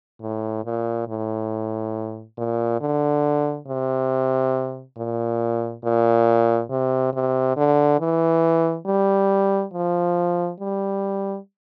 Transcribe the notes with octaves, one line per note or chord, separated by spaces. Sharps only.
A2
A#2
A2
A#2
D3
C3
A#2
A#2
C3
C3
D3
E3
G3
F3
G3